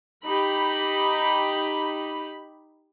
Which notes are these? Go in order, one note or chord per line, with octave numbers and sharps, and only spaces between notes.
D#4 G4 B5